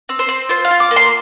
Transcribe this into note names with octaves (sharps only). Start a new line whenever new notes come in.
C4
C5
C4
F4 C5
F5
F4
D6
A#3
C6